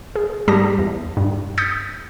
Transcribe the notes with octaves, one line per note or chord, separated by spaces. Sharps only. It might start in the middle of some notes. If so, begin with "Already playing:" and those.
G#4
G#2 G3 G4 A5 D#6 A#6
E2
G2
D#6 G6 A6 B6 C#7